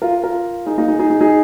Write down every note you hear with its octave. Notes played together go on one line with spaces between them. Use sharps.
F4 A#4
F4 A#4
D#4 G#4
A#3 D#4
D#4 G#4
D#4 G#4
D#4 G#4
D#4 G#4